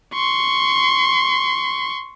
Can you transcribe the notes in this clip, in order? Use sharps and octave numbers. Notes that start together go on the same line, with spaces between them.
C6 C#6